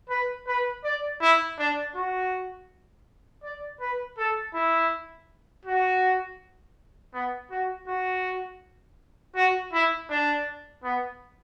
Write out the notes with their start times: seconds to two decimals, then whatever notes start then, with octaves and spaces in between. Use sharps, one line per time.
0.10 B4
0.47 B4
0.84 D5
1.21 E4
1.59 D4
1.95 F#4
3.43 D5
3.81 B4
4.18 A4
4.54 E4
5.65 F#4
7.14 B3
7.51 F#4
7.87 F#4
9.36 F#4
9.73 E4
10.10 D4
10.84 B3